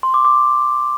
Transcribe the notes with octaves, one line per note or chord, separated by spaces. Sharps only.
C6
D6
D6